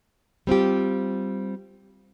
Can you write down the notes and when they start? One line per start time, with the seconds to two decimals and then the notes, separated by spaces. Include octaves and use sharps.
0.47 G3 C4 F4 G4